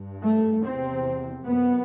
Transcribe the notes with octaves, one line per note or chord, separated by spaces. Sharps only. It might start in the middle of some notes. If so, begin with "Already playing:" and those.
Already playing: G2
A3
E2 C3 C4
F#2 B3